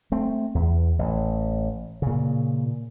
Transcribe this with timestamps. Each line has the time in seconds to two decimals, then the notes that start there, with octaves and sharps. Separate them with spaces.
0.12 A3 C4
0.55 E2
0.99 A1
2.02 A#2 C#3